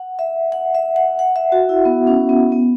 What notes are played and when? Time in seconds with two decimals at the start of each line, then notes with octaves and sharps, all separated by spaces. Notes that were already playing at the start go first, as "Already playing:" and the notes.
Already playing: F#5
0.19 E5
0.52 F#5
0.75 E5
0.96 F#5
1.19 F#5
1.36 E5
1.52 F#4
1.69 E4
1.85 B3
2.07 C#4
2.29 B3
2.52 B3